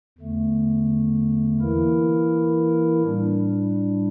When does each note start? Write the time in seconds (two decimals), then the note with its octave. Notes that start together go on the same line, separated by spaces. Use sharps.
0.18 E2 D3 A3
1.60 E3 A#3 E4 A#4
3.02 A2 G3 D4